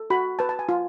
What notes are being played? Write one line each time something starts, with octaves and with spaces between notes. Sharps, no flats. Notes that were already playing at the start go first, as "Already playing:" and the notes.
Already playing: A4
F#4 B5
B4 A5
A5
G#5
F4